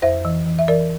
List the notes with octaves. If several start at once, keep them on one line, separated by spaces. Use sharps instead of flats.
F2 C5 E5
E3
E3
E5
E3 A#4 D5